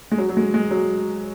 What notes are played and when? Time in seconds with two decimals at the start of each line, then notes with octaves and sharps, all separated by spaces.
0.12 G#3
0.18 F#3
0.29 F#3
0.37 G#3
0.54 G#3
0.71 F#3